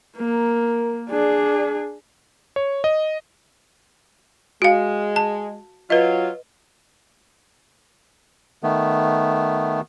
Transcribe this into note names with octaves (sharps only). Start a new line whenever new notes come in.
A#3 A#4
D4 G#4 D5
C#5
D#5
G#3 F#4 F5
A5
F#3 F4 B4 D#5
D#3 A3 B3